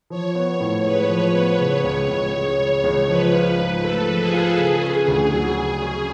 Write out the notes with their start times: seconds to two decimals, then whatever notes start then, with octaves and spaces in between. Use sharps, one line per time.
0.10 F3 C#5
0.35 B3
0.60 A2
0.85 G#3 B4
1.10 F3
1.35 B3
1.59 C#3 C#5
1.84 C#2
2.09 C#2
2.34 G#3
2.59 C#3
2.84 C#2
3.09 F3 B4
3.33 F4
3.58 G#2
3.83 A3 A4
4.08 F3
4.21 G#4
4.33 F4
4.58 C#3 G#4
4.83 C#4
5.08 D2
5.32 F#3 G#4
5.57 C#3
5.82 C#4